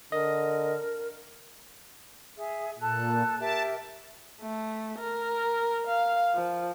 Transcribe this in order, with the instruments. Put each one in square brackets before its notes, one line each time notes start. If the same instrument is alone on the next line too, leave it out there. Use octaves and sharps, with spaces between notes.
[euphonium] D3 [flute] A#4 [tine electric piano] D#5
[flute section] G#4 E5
[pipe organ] A#2 [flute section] A4 A5 F#6
[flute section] G4 A#4 E5 [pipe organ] A5
[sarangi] A3
A#4
F5
F3